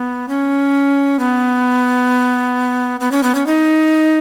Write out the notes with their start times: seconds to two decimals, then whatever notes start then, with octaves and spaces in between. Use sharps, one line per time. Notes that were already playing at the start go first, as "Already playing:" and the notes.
Already playing: B3
0.28 C#4
1.19 B3
3.00 B3
3.12 C#4
3.23 B3
3.35 C#4
3.46 D#4